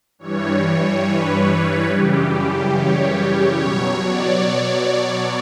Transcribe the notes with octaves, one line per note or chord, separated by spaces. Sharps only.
G2 E3 G3 C#5
B4
F#2 C#3 E3 G3 G4
C#5
B2 F#3 C#5
D5